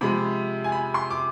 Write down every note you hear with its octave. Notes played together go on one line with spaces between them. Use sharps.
C3 F3 G#3 B5
G#5
B5
C6
D6